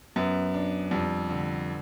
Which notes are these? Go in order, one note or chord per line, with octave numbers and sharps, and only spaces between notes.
F#2 B3
D4
F2 G3
D3